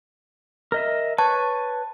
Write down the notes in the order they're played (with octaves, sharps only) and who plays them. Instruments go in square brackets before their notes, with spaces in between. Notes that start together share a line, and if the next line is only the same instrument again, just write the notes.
[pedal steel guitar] A#4 D#5 E5
[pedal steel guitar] B4 C#5 C#6 [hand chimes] A5